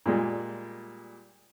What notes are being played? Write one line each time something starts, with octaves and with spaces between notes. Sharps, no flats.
A#2 G3 G#3